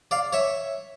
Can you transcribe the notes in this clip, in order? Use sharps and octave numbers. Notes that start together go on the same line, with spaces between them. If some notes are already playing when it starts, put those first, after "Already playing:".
D5 F5
C#5 E5